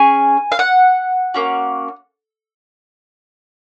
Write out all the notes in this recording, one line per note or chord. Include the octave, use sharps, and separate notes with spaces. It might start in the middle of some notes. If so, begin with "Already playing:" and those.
Already playing: C#4 G#4 G#5
F5
F#5
A#3 C#4 F#4